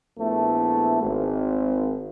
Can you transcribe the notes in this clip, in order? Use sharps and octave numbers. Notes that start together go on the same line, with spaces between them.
A#1 A3 B3 E4
G#1